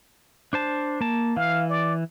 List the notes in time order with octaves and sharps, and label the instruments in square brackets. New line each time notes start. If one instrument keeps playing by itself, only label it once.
[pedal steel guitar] D4 C5 A5
A#3 A5
[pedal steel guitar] E3 [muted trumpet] F5
[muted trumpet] D5